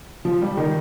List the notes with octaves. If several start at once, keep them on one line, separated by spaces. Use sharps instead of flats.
F3
G3
D#3